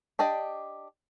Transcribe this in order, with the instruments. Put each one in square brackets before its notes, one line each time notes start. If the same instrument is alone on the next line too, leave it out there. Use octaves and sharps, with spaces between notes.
[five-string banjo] D4 G4 D5 D#5